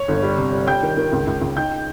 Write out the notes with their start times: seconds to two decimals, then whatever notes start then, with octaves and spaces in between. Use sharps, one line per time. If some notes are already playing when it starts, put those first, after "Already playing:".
Already playing: C#5
0.08 G1
0.23 G3
0.37 C3
0.53 G3
0.67 G3 G5 G6
0.83 D#3
0.97 D#3
1.13 C#2
1.27 C#2
1.42 C#2
1.56 D#4 G5 G6